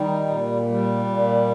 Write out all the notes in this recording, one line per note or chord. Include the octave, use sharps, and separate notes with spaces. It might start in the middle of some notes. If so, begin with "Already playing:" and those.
Already playing: D#3 G3 D#4
A#2
G3
A#2